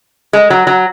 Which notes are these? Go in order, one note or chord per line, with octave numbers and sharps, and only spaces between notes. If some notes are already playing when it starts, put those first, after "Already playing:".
G#3
F#3
F#3